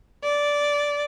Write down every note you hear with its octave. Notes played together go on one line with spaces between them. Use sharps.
D5